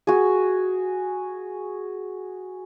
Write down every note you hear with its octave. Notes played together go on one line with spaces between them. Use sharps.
F#4 G#4